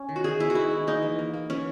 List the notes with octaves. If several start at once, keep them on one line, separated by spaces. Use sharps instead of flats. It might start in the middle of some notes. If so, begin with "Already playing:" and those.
Already playing: C#4
D#3
F#4
D#3 G#4
B3 E4
F#4
D#3 E4
G#3
A#3 D#4
E3
A#3
A#3
E3 C#4